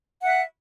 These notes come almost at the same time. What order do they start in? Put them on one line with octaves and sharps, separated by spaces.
F#5 E5 F#6